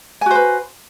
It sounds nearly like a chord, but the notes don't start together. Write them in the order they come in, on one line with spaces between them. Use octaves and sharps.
G#5 F#4 C5 B4